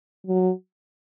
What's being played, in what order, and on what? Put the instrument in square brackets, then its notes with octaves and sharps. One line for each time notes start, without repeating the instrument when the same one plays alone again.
[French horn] F#3